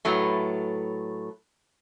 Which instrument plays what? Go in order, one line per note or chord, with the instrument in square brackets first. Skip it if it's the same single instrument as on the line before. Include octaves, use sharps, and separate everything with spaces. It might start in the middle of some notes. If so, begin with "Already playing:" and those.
[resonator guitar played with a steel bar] A2 F#3 A3 B3